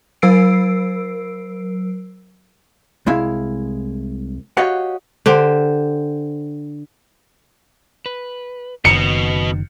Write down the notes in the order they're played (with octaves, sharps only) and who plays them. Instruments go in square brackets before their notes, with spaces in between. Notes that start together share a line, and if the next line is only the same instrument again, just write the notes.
[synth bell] F#3 A#4 E6 C7 D7
[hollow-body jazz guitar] C2 G#3 E4 F5
F#4 G4 C#5 D#5 F5 F#5
[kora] D3 G4 C5
[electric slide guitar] B4
[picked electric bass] F#1 [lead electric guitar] B2 [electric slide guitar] D#3 [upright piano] C#7